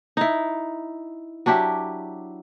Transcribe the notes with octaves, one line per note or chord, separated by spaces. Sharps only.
D#4 E4
F#3 D4 E4 G4